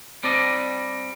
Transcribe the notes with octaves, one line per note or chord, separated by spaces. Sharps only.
G3 C4 D4 D5 D#5